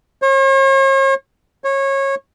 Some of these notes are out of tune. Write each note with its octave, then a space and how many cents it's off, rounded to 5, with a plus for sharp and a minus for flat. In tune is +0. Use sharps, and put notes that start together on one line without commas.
C#5 -45
C#5 -25